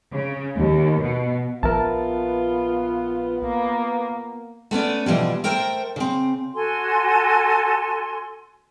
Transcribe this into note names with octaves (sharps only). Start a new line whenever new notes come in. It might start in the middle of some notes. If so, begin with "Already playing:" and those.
C#3
D#2
B2
A#1 B3 F4 A#4 E5 A5
A#3
A3 B3 C#4 D5
B2 E3 F3 G3
A3 A#4 C5 G5
C#3 C4
F#4 A4 G#5 C6